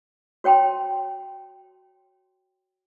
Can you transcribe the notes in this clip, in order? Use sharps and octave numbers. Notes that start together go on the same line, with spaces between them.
F#4 C#5 G5 A5 C6